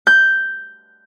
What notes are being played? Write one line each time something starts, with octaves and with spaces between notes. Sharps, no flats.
G6